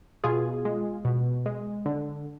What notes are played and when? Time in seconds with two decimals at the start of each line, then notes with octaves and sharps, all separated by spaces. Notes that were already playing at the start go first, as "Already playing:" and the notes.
0.24 B2 F4 G#4
0.65 G#3
1.05 B2
1.46 G#3
1.86 D3